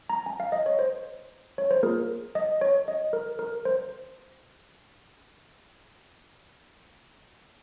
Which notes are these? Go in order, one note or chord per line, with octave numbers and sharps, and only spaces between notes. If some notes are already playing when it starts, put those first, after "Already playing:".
A#5
G#5
F5
D#5
C#5
C5
C#5
C5
A#3 F4 G#4 A#4
D#5
C#5
D#5
A#4
A#4
C5